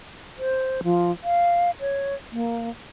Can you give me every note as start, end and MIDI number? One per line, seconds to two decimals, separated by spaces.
0.38 0.81 72
0.84 1.11 53
1.24 1.71 77
1.80 2.15 73
2.32 2.69 58